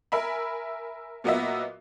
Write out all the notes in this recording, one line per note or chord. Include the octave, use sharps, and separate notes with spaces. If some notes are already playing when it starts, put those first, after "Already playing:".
A#4 E5 G#5 B5
A#2 F#3 A#3 B3 D#5 E5